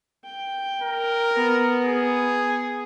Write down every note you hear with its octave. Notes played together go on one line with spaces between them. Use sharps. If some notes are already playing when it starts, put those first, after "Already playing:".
G5
A#4
B3
G#4